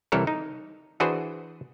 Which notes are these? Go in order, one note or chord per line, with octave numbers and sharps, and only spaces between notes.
C2 E3 G3 A4 A#4 C#5
D#4
E3 D4 F#4 G#4 B4 C5